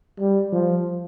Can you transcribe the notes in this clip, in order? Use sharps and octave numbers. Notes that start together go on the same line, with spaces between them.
G3
F3